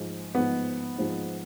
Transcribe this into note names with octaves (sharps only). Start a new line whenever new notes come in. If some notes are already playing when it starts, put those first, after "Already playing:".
Already playing: G#2 F3 G#3
G#2 F3 G#3 B3
G#2 F3 G#3